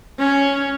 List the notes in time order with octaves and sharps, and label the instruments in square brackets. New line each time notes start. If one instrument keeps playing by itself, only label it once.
[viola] C#4